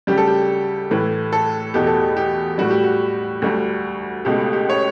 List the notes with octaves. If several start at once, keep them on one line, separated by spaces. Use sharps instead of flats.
D2 C#3 G3 G4
A4
G4
A2 E3 A3 B4
A4
E2 B2 A3 G4
A4
G4
G4
A2 G3 F#4
G4
F#4
D2 D3 G3
C#2 B2 A3 G4
G4
C#5